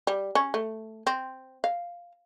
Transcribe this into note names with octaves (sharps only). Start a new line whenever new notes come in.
G3
C#4
A3
C4
F5